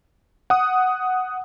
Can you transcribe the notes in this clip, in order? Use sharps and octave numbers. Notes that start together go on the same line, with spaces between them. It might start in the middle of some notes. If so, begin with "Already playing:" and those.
F#5 D#6